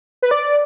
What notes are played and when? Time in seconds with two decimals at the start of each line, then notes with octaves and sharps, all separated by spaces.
0.22 B4
0.31 D5